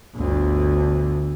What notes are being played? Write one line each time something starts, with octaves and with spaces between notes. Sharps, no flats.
G1 D2